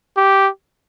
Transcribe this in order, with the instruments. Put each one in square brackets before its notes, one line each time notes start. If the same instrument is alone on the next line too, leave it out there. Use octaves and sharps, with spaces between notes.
[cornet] G4